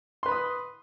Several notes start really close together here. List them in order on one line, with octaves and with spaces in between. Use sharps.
C6 B4 B5 D#6